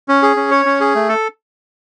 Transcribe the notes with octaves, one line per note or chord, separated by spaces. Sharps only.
C#4
G#4
C#4
C#5
C#4
G#4
A3
A4